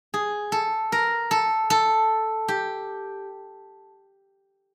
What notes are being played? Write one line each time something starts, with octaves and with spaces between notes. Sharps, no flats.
G#4
A4
A#4
A4
A4
G4